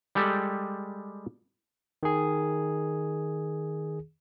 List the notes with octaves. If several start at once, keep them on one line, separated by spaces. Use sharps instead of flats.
G3 G#3 G4 A4
D#3 G#4